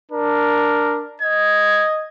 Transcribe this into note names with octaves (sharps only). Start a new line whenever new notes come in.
D4 A#4
D#5 G#6